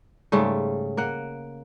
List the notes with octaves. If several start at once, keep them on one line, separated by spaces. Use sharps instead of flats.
G#2 C#3 G3 A3
A#3 F#5